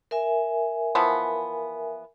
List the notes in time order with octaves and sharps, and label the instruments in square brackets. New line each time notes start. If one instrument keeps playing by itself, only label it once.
[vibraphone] A#4 E5 G#5
[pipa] E3 F3 B3